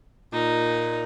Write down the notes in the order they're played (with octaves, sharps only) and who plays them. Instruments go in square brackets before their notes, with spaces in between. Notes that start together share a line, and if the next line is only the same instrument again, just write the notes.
[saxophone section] A#2 [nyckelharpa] D#4